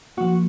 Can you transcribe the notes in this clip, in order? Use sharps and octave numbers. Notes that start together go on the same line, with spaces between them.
F3 A#3 F#4